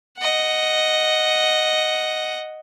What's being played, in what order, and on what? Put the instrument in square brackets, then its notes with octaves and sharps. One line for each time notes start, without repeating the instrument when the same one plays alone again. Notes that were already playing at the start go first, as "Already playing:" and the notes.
[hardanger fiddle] D#5 F#5